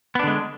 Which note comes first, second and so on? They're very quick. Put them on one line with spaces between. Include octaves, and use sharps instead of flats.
B3 D4 D3 G#3